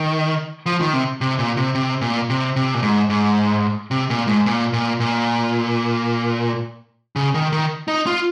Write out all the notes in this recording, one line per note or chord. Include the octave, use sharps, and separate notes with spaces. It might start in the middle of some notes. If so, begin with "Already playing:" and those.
Already playing: D#3
F3
D#3
C3
C3
A#2
C3
C3
A#2
C3
C3
A#2
G#2
G#2
C3
A#2
G#2
A#2
A#2
A#2
C#3
D#3
D#3
D#4
F4